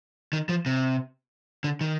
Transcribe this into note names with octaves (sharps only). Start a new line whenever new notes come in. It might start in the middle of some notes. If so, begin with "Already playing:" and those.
D#3
F3
C3
D3
D#3